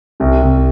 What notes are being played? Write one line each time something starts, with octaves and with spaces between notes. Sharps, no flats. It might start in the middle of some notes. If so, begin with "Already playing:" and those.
C2 C3
C2 C3